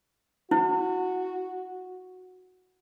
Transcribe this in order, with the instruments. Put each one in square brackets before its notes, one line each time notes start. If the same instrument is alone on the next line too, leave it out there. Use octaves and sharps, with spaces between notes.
[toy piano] E4 [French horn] F#4